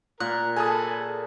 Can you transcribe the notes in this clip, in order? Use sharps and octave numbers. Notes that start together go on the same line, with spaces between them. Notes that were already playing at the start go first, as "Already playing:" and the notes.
A#2 A#4 F#6
G#4 A4 G#5 A5 B5 D#6